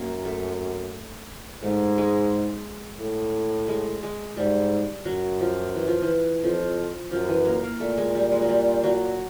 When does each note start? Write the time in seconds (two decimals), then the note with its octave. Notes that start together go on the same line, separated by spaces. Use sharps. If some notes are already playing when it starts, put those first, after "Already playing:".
Already playing: F#2 A#3
0.25 A3
1.63 G#2 A3
1.98 G#3
3.00 A2
3.68 G#3
4.03 G#3
4.37 G#2 G3
5.05 F#2 F#3
5.40 F3
5.75 E3
5.87 F3
6.02 E3
6.43 F2 F3
7.11 F#2 F3
7.28 E3
7.45 A#3
7.63 A#3
7.80 A#2 A3
7.97 G#3
8.15 G3
8.32 G#3
8.42 F#3
8.49 G3
8.83 F#3